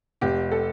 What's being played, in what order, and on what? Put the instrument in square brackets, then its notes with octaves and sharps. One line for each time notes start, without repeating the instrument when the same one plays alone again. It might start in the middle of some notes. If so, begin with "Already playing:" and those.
[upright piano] F1 G4
A4